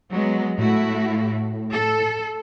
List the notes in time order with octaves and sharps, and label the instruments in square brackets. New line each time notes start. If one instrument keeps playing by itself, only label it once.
[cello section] F#3 G#3 B3
[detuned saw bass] A2 [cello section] A3 E4 F#4
[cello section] A4